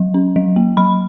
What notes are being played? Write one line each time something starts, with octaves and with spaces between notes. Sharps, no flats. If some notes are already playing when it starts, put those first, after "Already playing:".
Already playing: F#3
C#4
F#3
A#3
F#3 B5